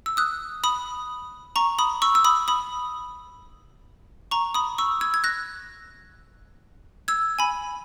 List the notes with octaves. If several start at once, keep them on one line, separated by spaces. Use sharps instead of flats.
E6
D#6 F#6
B5 D#6
A#5 C#6
B5 D#6
C#6 E6
E6
B5 D#6
B5 D#6
A#5 C#6
B5 D#6
C#6 E6
E6 G#6
G#6
F#6 A#6
E6 G#6
G#5 B5